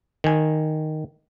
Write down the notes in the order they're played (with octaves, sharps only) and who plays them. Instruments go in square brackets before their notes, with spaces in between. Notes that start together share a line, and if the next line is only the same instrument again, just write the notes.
[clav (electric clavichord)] D#3 G#5